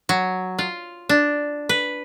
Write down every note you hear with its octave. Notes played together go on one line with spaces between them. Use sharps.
F#3
F4
D4
B4